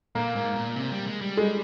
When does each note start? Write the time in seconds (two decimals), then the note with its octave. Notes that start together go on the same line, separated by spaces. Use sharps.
0.15 A#2 A#3
0.35 G#2
0.56 A#2
0.76 C3
0.91 G3
1.07 G#3
1.21 G3
1.37 G#3